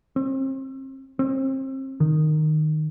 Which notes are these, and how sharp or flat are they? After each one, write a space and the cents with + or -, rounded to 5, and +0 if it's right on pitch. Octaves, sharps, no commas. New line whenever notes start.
C4 +35
C4 +35
D#3 -15